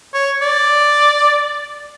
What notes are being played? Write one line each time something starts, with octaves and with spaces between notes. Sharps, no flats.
C#5
D5